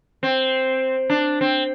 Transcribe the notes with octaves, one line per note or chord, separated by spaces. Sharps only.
C4
D4
C4